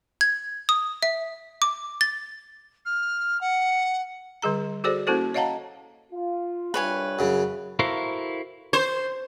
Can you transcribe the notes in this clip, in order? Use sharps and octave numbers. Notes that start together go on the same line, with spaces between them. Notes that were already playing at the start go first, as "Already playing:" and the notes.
G#6
D#6
E5
D6
A6
F6
F#5
D3 G3 G#4 A#5
F#4 G#4 A4 C5 D5
A#3 C#4 E4 F#4 A4 C5
C#5 D#5 F5 F#5 A5 A#5
F4
C2 G2 B4 C#5 G#5
F#2 C#3
E4 F#4 A4 A#4 C5 F5
C5